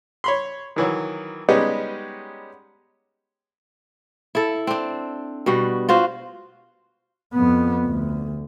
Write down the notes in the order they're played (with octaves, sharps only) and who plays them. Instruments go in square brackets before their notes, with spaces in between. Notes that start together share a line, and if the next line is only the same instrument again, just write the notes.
[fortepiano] C#5 B5 C6
D#3 E3 F#3
G3 G#3 B3 C#4 D#4 G4
[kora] E4 A4
C4 D4
B2 G3 F#4
F4 F#4 C5
[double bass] F2 B3
D2